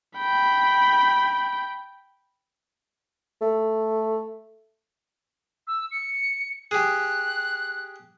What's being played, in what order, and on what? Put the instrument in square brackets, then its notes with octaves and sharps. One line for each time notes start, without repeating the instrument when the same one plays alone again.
[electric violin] G5 B5
[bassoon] A3
[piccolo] E6
C#7
[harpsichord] G4 G#4 [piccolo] F#6